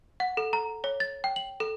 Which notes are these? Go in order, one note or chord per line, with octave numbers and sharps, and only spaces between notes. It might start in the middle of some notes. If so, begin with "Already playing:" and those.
F#5
A4
A#5
C#5
A6
G5
F#7
A4